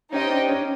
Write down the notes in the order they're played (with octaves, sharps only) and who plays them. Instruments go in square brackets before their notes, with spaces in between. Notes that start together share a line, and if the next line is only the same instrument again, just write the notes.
[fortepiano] C#4 [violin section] D#4 G4 C5 D#5 G5
[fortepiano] D4
C#4